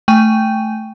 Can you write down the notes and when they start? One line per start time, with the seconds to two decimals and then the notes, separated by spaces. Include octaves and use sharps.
0.08 A3 G5 G#5 D#7